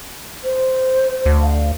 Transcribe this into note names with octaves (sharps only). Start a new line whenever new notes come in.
C5
D2
F5